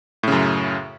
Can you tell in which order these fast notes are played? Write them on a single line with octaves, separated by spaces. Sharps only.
A2 C#3 F#2